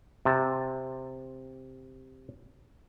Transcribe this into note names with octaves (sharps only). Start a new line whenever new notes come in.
C3 A5